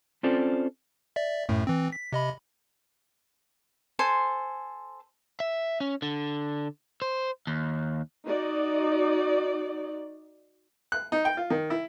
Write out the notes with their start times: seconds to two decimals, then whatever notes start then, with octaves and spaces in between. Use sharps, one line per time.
0.23 C4 C#4 F4 A4 C5 D5
1.16 D5 E5
1.49 F#2 A2 A3
1.67 E3 C4
1.92 B6
2.12 C3 D#5 B5
3.99 A4 C5 G#5 C6
5.40 E5
5.80 C#4
6.02 D3
7.02 C5
7.47 D#2
8.25 D#4 F#4 D5
10.92 F#6
11.12 D#4
11.25 G5
11.37 F4
11.50 D#3
11.70 E4